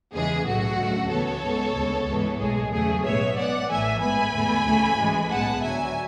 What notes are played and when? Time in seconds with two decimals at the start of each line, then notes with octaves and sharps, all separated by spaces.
0.14 E2 C#3 E3 G#3 G#4
0.46 B1 A2 F#3 A3 F#4
0.78 D2 C#3 F#3 A3
1.11 C#2 C#3 E3 B3 A4 C#5
1.43 G#2 G#3 B3
1.75 D2 C#3 G#3 B3
2.08 G#2 E3 G#3 B3
2.40 B1 A2 G#3 G#4
2.72 E2 C#3 F#3 A3 G#4
3.04 B1 A2 G#3 B3 C#5 E5
3.36 G#2 G#3 B3 D5 F#5
3.68 A1 A2 E3 A3 E5 G#5
4.01 G#2 G#3 B3 G#5 B5
4.33 E2 D3 A3
4.66 D2 C#3 E3 A3
4.98 G#2 E3 G#3
5.30 B1 A2 G#3 B3 F#5 A5
5.62 D2 D3 F#3 E5 G#5